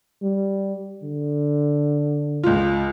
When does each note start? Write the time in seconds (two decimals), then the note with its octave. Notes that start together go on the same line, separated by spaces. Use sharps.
0.23 G3
1.04 D3
2.44 C#2 F4